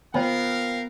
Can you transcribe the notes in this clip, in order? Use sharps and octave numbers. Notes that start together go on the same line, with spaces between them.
B3 F4 A#4 C5 F5 G5